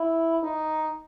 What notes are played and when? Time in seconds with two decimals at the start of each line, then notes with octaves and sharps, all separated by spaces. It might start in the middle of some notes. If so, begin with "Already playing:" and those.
Already playing: E4
0.43 D#4